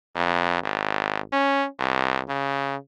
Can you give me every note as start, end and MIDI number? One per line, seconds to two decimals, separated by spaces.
0.16 0.59 41
0.63 1.20 32
1.33 1.66 61
1.80 2.21 36
2.29 2.76 49